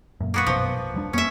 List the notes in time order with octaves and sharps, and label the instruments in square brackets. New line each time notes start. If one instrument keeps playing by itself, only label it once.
[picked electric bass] F#2 A#2
[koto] A#3 B3 F#4
[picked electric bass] A#1 F#2 B2 [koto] F3
[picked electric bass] E1 G3 D4
[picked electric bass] F2 A#3 B3 [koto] C#4 E5